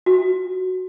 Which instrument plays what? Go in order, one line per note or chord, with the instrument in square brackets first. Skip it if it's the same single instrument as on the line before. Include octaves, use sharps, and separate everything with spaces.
[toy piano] F#4